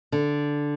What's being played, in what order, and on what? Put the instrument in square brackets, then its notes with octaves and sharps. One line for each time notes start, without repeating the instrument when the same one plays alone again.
[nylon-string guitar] D3